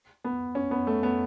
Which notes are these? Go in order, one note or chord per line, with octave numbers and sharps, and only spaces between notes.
B3
C#4
B3
A3
B3